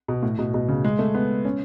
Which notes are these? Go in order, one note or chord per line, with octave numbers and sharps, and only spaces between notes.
B2
A2
B2
B2
C#3
G#3
A3
B3
C#4